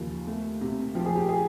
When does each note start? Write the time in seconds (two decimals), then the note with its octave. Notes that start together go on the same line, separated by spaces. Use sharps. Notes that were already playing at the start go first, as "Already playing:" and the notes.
Already playing: D#2 C#3 F3
0.27 A3
0.61 C3
0.95 F3 G4
1.05 G#4
1.16 G4
1.29 G#4